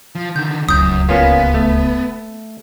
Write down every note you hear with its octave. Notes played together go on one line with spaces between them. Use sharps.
F3
D3 D#3 G6
D1 C#2 F#2 D#6 G6
A#3 B3 C#4 F4
A3